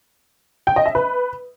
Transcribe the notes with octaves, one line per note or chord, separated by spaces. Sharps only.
G5
D#5
E5
B4